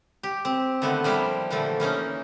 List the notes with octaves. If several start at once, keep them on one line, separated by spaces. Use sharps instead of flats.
G4
C4
D3 D#3 A3 B3
F3 G3 A#3 E4 C5
A#2 D3 E3 F3 A3
E3 A#3 C#4 D#4